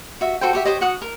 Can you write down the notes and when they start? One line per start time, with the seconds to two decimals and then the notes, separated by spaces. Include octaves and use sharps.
0.21 F#4 E5
0.41 F#4 A4 C5 G5
0.53 F#4 G4 E5
0.65 G4 C5 C#5 D#5
0.81 F#4 F#5 D#6
1.02 A#4